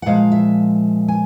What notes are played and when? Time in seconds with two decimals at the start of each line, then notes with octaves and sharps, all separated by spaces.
0.02 F#5
0.06 A#2 F3 G#3 F5
0.32 E5
1.08 G#5